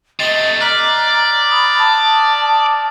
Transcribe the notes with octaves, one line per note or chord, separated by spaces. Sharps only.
C3 A3 D#5 A6 C7 G7
D5 A#5 F6 F#6 B6
B5 D#6 A6
A5 D6 D#6